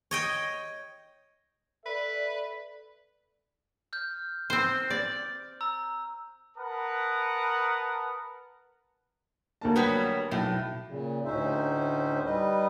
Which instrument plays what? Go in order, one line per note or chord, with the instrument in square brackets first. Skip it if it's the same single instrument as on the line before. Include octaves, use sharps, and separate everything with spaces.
[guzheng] C#5 D#5 G5
[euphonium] A4 [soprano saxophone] B4 [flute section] D5 [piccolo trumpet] E5
[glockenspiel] F6 G6
[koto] C4 C5
D5
[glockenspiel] A#5 E6
[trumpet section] A#4 B4 F#5 A5 D#6
[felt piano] D2 A#3 A5
[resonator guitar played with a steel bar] F#3 G3 B3
[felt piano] B1 [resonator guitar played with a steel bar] A2
[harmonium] A#2 C#3
D2 A2 C#4 D#4 C5 E5
G3 D#4 B4 D#5